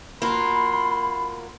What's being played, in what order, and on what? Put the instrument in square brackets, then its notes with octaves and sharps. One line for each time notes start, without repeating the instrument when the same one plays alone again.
[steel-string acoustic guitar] A#3 F4 F#4 [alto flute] B5 [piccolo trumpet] C6